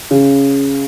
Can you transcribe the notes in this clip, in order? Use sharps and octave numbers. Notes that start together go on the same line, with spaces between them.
C#3